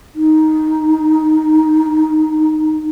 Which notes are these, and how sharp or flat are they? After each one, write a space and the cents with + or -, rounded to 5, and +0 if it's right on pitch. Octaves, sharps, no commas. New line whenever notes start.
D#4 +0